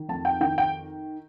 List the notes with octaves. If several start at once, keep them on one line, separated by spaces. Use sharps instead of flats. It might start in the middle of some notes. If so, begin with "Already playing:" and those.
Already playing: D#3
F2 A5
G5
D#3 G5
G5